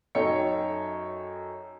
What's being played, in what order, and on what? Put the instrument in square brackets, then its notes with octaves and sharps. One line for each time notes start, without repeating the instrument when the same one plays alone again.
[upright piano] F#2 D#4 A4 C#5 G5 C#7